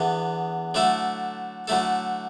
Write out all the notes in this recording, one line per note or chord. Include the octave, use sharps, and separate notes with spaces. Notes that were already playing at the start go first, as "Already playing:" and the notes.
Already playing: E2 D3 B3
D3 F#3 A3 E4 A4
D3 F#3 A3 E4 A4